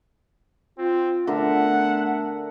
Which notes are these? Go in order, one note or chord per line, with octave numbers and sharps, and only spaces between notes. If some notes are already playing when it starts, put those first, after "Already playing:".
C4 F4
D3 A3 B3 D4 A#4 E5 F#5